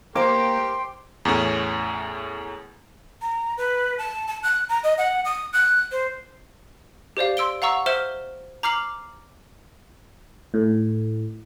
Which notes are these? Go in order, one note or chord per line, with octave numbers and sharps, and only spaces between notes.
A#3 G4 A#4 C5 G5 C6 D6
E2 A2 C#4
A#5
B4
A5
A5
F#6
A#5
D#5
F#5
D#6
F#6
C5
G4 C5 D5 F5
C6 E6 D7 G7
F5 F#5 A#5 C#6 E6
C5 E5 F6 E7 G7
A#5 D6 F6 C7 F#7
A2